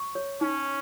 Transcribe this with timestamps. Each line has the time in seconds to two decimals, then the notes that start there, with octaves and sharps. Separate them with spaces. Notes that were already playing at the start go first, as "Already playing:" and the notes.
Already playing: C#6
0.15 C#5
0.41 C#4 D#4